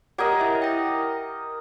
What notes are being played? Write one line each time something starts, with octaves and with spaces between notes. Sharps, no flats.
G4 A#4 C#5 D#5 F#5 G#6
E4 E5
G5 A#6